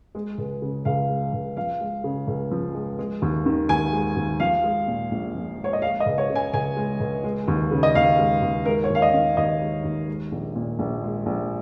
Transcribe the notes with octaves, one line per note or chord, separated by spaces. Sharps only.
G#3
C#2
C#3
C#2 F5
G#3
C#2
F3 F5
G#3
C#3
C#2
F3
G#3
G#3
D#2
D#3
D#2 G#5
G#3
D#2
F3 F5
G#3
A#2
A#1
F3
G#3
C#5
D#5
G#3 F5
D#5
C#2
C#5
C#3
G#5
C#2 G#5
G#3
C#2
G#3
D#2
C#3
D#5
D#2 F5
G#3
D#2
G#3 A#4
C#5
D#2 F5
D#5
D#3
D#2 D#5
G#3
D#2
G#3
A#1
A#2
A#1
G#3
A#1